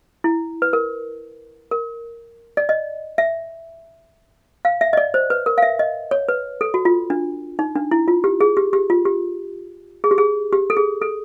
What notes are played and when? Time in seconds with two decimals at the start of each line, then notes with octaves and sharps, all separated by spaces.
0.24 E4
0.62 B4
0.73 A#4
1.71 A#4
2.57 D5
2.69 D#5
3.18 E5
4.65 F5
4.81 E5
4.93 D#5
4.97 D5
5.14 C5
5.30 B4
5.46 A#4
5.58 F5
5.62 E5
5.79 D#5
6.11 C#5
6.29 B4
6.61 A4
6.74 F#4
6.85 F4
7.10 D4
7.59 D#4
7.75 D4
7.91 E4
8.08 F4
8.24 G4
8.41 G#4
8.57 G4
8.73 G4
8.90 F4
9.05 G4
10.04 G#4
10.11 G4
10.18 G#4
10.53 G4
10.70 A4
10.77 G#4
11.02 A4